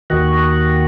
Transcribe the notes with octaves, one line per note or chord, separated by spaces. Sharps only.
D#2 D#3 F#4